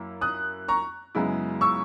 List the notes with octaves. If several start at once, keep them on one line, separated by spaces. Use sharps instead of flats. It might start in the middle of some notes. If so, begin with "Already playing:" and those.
Already playing: F#2 A#3 E4
D#6 F#6
A#5 C#6
F#2 C#3 G#3 B3 E4
C#6 E6